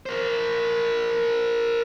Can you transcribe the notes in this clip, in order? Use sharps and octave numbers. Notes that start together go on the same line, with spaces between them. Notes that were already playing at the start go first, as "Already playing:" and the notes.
A#4 C5